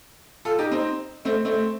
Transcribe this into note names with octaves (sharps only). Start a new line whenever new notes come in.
F4 A4
D#4 G4
C4 D#4
A3 C4
A3 C4